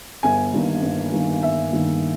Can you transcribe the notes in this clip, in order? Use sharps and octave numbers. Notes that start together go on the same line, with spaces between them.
G1 G#5
G2 D#3 A#3
G1
G2 D#3 A#3
G1 E5
G2 D#3 A#3